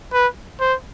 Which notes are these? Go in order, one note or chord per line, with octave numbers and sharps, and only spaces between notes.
B4
C5